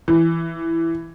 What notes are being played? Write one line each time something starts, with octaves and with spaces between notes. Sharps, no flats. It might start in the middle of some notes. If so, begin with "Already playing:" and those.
E3